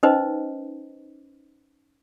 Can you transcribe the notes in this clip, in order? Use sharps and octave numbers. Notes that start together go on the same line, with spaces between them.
C#4 D#4 B4 C5 D#5